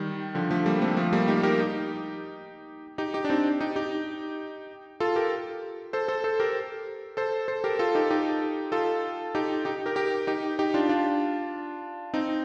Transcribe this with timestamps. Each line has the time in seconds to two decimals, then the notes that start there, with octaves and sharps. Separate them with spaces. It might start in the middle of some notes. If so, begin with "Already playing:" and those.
Already playing: D#3 G3
0.35 D3 F3
0.51 F3 A3
0.66 G3 A#3
0.81 A3 C4
0.97 F3 A3
1.13 G3 A#3
1.28 D#4 G4
1.43 G4 A#4
1.59 D#4 G4
2.98 D#4 G4
3.14 D#4 G4
3.25 D4
3.30 C4 D#4
3.61 D#4 G4
3.76 D#4 G4
5.00 F4 A4
5.16 G4 A#4
5.93 A4 C5
6.08 A4 C5
6.24 A4 C5
6.40 G4 A#4
7.17 A4 C5
7.48 A4 C5
7.64 G4 A#4
7.79 F4 A4
7.95 D#4 G4
8.10 D#4 G4
8.72 F4 A4
9.35 D#4 G4
9.65 D#4 G4
9.86 G4 A#4
9.96 G4 A#4
10.27 D#4 G4
10.59 D#4 G4
10.74 D4 F4
10.89 D4 F4
12.13 C4 D#4